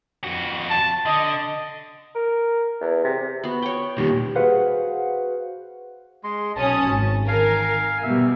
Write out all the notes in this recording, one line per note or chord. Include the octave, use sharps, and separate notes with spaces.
F2 F#4
A5
D3 D#5
A#4
E2
C3
B3 F#4
C#5 G5
A#2 D#3 G3
F#4 G#4 B4 C5 F5 F#5
G#3 C6
B1 C#4 A5 D#6
G#1
D#3 A#4 F5 G#5
B2 G3 E5